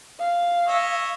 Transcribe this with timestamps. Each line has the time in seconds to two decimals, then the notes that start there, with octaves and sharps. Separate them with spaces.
0.19 F5
0.67 C#5 D#5 E5